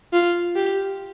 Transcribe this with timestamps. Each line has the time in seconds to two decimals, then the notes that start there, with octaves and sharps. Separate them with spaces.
0.13 F4
0.56 G4